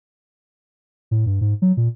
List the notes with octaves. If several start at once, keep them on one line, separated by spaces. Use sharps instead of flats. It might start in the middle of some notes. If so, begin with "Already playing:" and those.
A2
G2
G#2
F#3
A#2